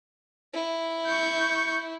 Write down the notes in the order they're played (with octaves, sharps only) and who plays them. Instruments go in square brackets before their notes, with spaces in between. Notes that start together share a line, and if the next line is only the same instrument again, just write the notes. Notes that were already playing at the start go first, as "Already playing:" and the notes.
[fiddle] E4
[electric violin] C#6 G6